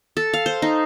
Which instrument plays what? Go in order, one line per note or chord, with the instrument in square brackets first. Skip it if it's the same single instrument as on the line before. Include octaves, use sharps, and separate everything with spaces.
[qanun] A4
F5
C5
D#4